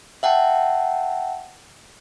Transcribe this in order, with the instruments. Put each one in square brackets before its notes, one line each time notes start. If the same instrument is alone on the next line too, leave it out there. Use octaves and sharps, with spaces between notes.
[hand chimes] E5 F#5 G5 A5